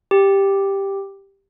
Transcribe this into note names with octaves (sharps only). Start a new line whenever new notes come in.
G4